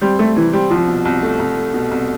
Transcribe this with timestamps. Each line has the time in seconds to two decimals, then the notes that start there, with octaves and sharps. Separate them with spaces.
0.01 G3 C4
0.19 G3 A3
0.36 C3 E3
0.53 G3 C4
0.70 C2 F3
0.88 B2
1.05 C2
1.22 A3
1.40 C2
1.57 A3
1.74 B2
1.91 C2